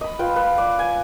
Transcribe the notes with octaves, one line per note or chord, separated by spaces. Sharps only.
D#5 B5
F4 B4 G5
B4
D5
G#5